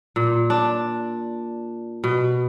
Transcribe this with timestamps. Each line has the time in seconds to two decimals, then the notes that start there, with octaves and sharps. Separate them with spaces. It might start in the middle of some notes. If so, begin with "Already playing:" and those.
0.16 A#2
0.50 D4
2.04 B2